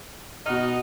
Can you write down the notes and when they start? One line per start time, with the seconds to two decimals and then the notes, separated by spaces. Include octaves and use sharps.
0.46 B2 D#4 F#4 D#5 F6